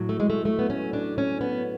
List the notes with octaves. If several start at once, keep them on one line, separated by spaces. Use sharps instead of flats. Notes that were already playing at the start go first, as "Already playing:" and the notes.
Already playing: A2 F#3
A3
G#3
A3
A3
B3
C#4
D4
C#4
B3